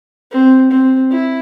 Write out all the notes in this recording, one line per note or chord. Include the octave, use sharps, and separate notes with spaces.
C4
C4
E4